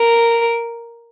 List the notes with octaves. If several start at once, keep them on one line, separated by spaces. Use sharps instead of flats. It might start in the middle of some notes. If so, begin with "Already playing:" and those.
Already playing: A#4